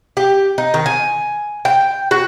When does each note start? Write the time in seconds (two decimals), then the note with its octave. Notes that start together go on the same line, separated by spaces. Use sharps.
0.17 G4
0.58 D#4
0.74 D#3
0.86 G#5
1.65 G5
2.11 F#4